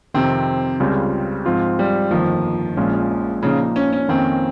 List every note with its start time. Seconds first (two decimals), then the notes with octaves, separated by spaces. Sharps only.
0.14 F2 C3 D#3 C4
0.80 C#2 C#3 G3 C4 F4
1.46 G#2 F3 C4 F4
1.79 G3
2.11 G1 F2 D#3 F3 A#3
2.77 A#1 A#2 G#3 C#4 F4
3.43 A#2 C#3 F3 A#3 D#4
3.76 C#4
3.93 C#4
4.09 F2 D#3 A#3 C4 C#4